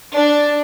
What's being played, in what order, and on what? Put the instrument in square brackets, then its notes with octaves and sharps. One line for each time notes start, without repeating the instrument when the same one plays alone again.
[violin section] D4